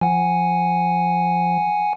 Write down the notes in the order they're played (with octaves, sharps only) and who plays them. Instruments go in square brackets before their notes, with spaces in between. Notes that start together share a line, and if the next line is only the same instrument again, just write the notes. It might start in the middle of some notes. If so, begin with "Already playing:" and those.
[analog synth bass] F3 [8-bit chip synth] F#5 G#5